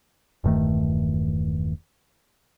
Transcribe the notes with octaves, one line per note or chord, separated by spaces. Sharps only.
E1 G2 D#3 A3